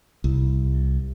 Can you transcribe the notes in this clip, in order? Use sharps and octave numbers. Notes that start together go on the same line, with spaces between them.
C2